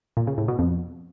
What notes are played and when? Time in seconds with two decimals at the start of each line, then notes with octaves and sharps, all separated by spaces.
0.17 A#2
0.27 C#3
0.38 A2
0.48 B2
0.59 F2